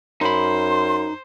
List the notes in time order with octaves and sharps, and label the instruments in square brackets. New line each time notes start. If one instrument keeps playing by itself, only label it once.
[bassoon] F#2 [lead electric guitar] D#4 B5 [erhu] C5 [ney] C6